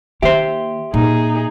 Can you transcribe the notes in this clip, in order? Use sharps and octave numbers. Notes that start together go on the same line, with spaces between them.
D#3 A#3 G4 C5 E5
A#2 D#4 G#4